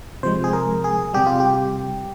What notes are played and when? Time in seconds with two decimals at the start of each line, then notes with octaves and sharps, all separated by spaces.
0.23 C3 F3 G#3 C5
0.44 G#4
0.53 A#4
0.84 G#4
1.14 C3 G3 G4
1.27 F4
1.40 G4